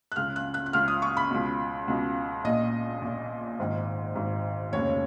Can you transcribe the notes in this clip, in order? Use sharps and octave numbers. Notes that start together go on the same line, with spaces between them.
F#6
C#2 C#3 F6
F#6
F#6
F#6
C#2 C#3 F6
D#6
C#6
B5
C#2 B2
C#2 B2
A#1 A#2 D#5
A#1 A#2
G#1 G#2 D#3
G#1 G#2 D#3
F1 D#2 C#3 C#5